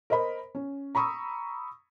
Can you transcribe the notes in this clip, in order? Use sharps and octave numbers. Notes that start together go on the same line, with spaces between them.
A#4 C5 D#5 B5
C#4
A#5 B5 C#6 D#6 E6